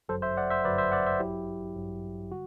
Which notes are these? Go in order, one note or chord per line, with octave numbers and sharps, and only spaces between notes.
G1 F#2 F#3 A4 C5
C5 E5
D5 F#5
C5 E5
G1 F#2 F#3 B4 D5
C5 E5
D5 F#5
C5 E5
A1 G2 F#3 E4 G4
A1 G2 F#3
D3 G3 F#4